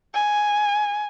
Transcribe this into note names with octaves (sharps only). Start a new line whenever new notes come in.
G#5